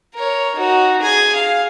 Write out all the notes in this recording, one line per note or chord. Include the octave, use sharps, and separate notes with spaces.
A#4 C#5
D#4 F#4
G#4 G#5
F5